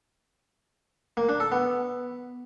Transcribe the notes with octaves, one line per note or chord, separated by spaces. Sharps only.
A#3
D4
A4
B3